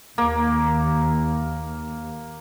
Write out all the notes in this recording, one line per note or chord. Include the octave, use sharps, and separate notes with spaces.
D#2 A#3